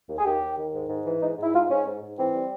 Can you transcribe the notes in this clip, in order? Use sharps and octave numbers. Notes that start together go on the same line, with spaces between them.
D#2
G#4
D#2 G4
D#2
D#3
G#2
G#2
E3
G#2 D#4
G#2
E4
G#2 F4
G#2 C#4
G#2
G#2
E3 C4
G3